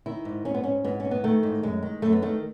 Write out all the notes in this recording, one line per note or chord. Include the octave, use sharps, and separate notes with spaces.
D#3 E4
G#2
G#2 C#4
B3
G#2 C#4
G#2 B3
D#3 C#4
B3
D#3 A3
G#2
F#2 G#3
D#3
F#2 A3
B3
D#3 A3